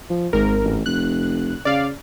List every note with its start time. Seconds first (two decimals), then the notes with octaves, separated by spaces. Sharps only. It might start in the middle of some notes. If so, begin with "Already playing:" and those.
0.10 F3
0.33 G#1 G#2 A#4
0.63 A1
0.86 F1 F#6
1.65 C#3 D5 F5